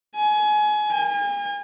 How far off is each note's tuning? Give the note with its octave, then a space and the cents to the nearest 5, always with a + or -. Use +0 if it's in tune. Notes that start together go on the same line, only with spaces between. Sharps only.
G#5 +25
G#5 -40